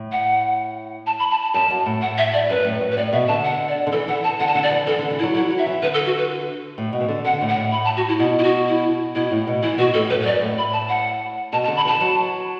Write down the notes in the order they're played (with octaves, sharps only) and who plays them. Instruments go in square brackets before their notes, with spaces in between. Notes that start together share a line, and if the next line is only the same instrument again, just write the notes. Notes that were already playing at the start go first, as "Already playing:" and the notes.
Already playing: [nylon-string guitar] A2
[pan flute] F#5
A5
B5
A5
A5
[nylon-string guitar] F#2 [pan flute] A5
[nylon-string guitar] F#2
A2
[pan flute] F#5
E5
D5
[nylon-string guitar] F#2 [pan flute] B4
[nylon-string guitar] A2
F#2
[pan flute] B4
[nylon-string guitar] A2 [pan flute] D5
[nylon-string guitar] B2 [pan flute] E5
[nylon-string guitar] D3 [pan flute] A5
[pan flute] F#5
D5
[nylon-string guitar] D3
[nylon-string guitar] E3 [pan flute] A4
[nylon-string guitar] E3 [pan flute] F#5
[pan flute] A5
[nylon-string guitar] D3 [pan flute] F#5
[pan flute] A5
[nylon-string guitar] D3 [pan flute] F#5
[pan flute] D5
[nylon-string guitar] E3
[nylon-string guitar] E3 [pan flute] A4
[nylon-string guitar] D3
E3
[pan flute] E4
[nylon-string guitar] F#3
[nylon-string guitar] F#3 [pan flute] E4
[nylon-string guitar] F#3
[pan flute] E5
[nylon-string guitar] E3
[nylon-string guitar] D3 [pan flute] B4
[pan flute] A4
F#4
B4
[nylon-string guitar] A2
B2
E3
D3
[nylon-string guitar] D3 [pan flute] F#5
[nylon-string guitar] A2
[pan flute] F#5
[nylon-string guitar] A2
[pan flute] B5
A5
F#4
E4
[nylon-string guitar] B2 [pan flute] E4
[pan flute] E4
F#4
E4
[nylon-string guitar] B2 [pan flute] E4
[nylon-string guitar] A2
B2
[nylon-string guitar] E3 [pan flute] E4
[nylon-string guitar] B2 [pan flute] F#4
[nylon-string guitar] A2 [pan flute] A4
[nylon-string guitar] F#2 [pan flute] B4
[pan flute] B4
[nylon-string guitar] F#2 [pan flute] D5
[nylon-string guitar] A2
[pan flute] B5
A5
F#5
[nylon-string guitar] B2 [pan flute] A5
[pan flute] A5
[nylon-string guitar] D3
[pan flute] B5
[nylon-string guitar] E3 [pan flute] A5
[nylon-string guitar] F#3